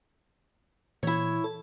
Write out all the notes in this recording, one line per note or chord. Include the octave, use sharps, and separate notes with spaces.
A#2 E3 E4 C#5 G#6
A4